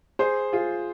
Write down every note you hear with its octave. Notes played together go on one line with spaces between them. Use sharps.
G#4 C5
F4 G#4